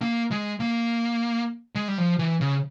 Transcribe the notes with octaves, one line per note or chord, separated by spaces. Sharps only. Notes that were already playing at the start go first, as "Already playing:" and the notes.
A#3
G#3
A#3
G#3
G3
F3
E3
C#3